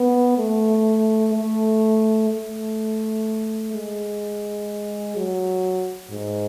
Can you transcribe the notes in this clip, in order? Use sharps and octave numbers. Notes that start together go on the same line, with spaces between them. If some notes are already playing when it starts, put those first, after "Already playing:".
Already playing: B3
A3
A3
A3
G#3
F#3
G#2